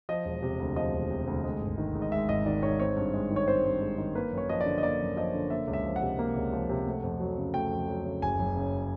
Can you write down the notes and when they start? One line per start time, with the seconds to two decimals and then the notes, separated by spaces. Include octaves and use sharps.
0.09 F3 D#5
0.25 E1
0.42 C3
0.60 D2
0.76 F3 D#5
0.93 E1
1.10 C3
1.27 D2
1.44 G#3
1.61 G#1
1.78 D#3
1.95 G#2
2.02 D#5
2.12 G#3 E5
2.29 G#1 D#5
2.46 D#3 D5
2.63 G#2 C#5
2.79 C4 C#5
2.97 G2
3.14 G#3
3.30 D#3
3.36 C#5
3.48 C4 C5
3.65 G2
3.81 G#3
3.98 D#3
4.15 A#3 B4
4.32 F#2
4.38 C#5
4.49 F3 D#5
4.61 D5
4.66 D3
4.78 D#5
4.83 A#3 D5
5.00 F#2
5.17 F3 D#5
5.34 D3
5.50 A#3 E5
5.67 C#2
5.73 E5
5.85 F3
5.96 F#5
6.01 C3
6.19 A#3
6.36 C#2
6.53 F3
6.69 C3
6.87 A3
7.04 F2
7.20 F#3
7.37 C#3
7.54 A3 G5
7.71 F2
7.88 F#3
8.05 C#3
8.22 F#1 G#5
8.39 F#1
8.56 C#3